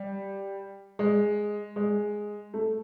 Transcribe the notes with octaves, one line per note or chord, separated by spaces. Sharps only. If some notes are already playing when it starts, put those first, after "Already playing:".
Already playing: G3
G#3
G#3
A3